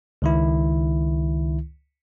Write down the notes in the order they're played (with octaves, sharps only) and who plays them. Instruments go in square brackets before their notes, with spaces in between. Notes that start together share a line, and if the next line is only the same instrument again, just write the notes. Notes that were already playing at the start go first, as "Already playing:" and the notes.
[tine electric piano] C#2 D#3 E4